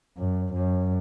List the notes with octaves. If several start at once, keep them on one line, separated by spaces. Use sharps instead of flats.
F#2
F#2